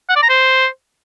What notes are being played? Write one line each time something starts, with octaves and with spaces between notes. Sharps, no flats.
F#5
D5
A#5
C5